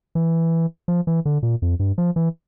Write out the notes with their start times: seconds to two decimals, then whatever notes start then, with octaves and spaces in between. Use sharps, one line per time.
0.15 E3
0.88 F3
1.07 E3
1.25 D3
1.43 A#2
1.62 F2
1.79 G2
1.98 F3
2.16 E3